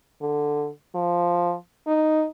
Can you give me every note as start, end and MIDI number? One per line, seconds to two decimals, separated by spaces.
0.21 0.69 50
0.95 1.55 53
1.87 2.26 63